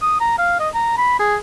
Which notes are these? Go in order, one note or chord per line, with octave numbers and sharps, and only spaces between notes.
D#6
A#5
F5
D#5
A#5
B5
G#4